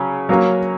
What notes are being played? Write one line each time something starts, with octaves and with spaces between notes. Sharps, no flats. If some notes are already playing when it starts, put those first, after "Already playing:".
Already playing: C#3 F#3 C#4
F#3 A#3 C#4